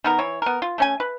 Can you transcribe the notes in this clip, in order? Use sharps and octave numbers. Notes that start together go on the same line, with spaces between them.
D#3 B3 A#4
E3 C#5
B3 A#4
F4
A3 C#4 G#5
B4